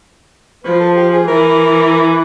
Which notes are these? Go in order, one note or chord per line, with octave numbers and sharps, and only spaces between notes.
F3 B4
A4
G4
G#4
E3 A#4